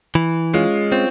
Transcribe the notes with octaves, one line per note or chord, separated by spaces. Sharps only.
E3
G#3 C#4 F4
C4 C#4 F4